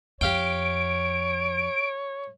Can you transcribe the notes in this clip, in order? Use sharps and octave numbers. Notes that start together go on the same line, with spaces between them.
F2 G4 C#5 F5 G5 D7